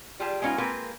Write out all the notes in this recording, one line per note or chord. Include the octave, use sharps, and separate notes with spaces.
G3 F4 G4 G#4 A5
G#3 B3 C#4 D#4 F4
G#3 A#3 C4 F4 A#4 B4